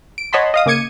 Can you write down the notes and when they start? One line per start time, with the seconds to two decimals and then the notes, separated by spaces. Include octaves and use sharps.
0.18 D7
0.33 C#5 D#5 F#5 A5 B5 C6
0.54 D#5 F5 D#6
0.66 C#3 A#3 D6 G#6 C#7 D#7